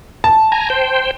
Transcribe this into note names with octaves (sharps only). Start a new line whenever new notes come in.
A5
G#5 A#5
C5 G5